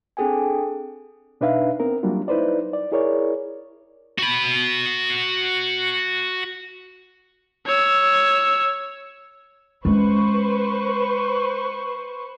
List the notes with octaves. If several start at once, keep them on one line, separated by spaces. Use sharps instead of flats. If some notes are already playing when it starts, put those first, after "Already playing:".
C4 D4 G#4 A4 G5 G#5
B2 D4 D#4 B4 E5 F5
B3 C4 A#4
F#3 G3 A#3 D4 F4
D#4 E4 B4 C5 D5
D5
E4 G#4 A#4 C#5 D5
F#4 B5
C#5 E6
G#3 C#4 B4 C5 C#6